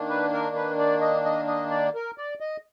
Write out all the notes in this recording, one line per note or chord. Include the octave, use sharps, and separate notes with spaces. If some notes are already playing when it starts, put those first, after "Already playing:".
Already playing: D#3 A#3 D4
B4
A#4
B4
D5
D#5
D#5
D#5
D5
A#4
D5
D#5